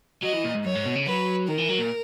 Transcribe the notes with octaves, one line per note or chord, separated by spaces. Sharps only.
F#3 D#5
E3
A#2
G#2
F#2 C#5
G#2
B2
C#3
F#3 B4
D#3 A#4
E3
F#3
A#2